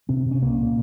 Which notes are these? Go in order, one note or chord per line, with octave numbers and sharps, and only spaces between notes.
C3 C4
C3
C#4
C2 A#3
A#2